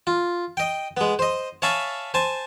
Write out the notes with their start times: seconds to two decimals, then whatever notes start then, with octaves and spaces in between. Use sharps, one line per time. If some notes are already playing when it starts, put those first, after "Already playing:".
0.07 F4
0.57 D#5 G5
0.97 G#3 B3
1.19 C5 D#5
1.62 C#5 E5 F5 G#5 A5 B5
2.14 C5 G#5 A5